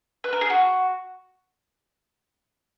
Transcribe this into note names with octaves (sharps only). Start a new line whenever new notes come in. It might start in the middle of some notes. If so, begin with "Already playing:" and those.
B4
A#4
G#4
F#4